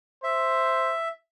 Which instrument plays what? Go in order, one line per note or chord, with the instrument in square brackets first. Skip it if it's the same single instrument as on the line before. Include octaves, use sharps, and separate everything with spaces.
[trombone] C5 [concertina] E5